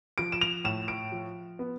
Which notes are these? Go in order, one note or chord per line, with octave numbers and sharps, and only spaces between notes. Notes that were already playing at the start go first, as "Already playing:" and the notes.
F3 D7
E7
F7
A2 E7
D7
F3
B3